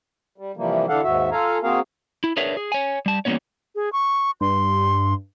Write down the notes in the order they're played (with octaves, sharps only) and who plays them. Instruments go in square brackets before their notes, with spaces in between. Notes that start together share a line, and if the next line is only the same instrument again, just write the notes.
[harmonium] G3
C3 E3 F3 G3 A#3
D3 E3 D4 A4 F5 F#5
D#2 G#2 F#4 E5
F4 A4 F5 G#5 A#5
A#3 C4 F#4 G#4 A#4 F5
[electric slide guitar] E4
D4 G#4 A#4 B4 C#5 E5
G#4
C#5 G#5
G3 A5
E3 G3 A#3 B3 C#4 C#5
[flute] G#4
C#6
[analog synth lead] G2 [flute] C6